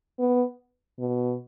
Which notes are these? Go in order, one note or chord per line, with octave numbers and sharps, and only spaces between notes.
B3
B2